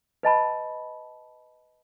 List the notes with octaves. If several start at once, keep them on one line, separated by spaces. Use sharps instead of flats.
B4 D#5 A5 B5